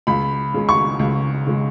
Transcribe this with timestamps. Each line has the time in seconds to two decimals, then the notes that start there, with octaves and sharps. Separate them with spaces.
0.07 C#2 B5
0.54 C#3 G#3
0.69 C#6
0.99 C#2
1.47 C#3 G#3